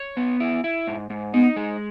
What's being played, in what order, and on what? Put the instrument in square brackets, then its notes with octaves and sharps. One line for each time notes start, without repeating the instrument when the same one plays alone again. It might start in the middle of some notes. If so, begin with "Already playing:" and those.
Already playing: [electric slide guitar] C#5
B3
E4
E4
G#2
G#2
[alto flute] B3 [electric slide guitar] D#4
[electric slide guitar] G#3